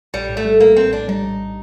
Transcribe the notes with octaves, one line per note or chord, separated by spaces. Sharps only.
A#1 G3
A2
A3
G3
A#1 A#3
A#1 C4
A2 D4
G3 D#4
A#1